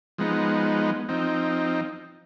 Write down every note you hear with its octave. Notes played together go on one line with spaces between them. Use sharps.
F3 G#3 B3 D#4
F3 C4 D#4